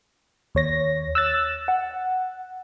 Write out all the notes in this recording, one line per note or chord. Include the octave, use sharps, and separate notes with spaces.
D#2 C#5 A#6
E6 F#6 A6
F#5